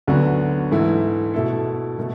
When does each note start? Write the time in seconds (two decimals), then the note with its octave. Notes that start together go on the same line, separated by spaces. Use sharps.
0.07 D2 D3 F#3 B3 F#4
0.71 G#2 E3 A3 E4
1.34 B2 A3 E4 A4
1.99 B2 A3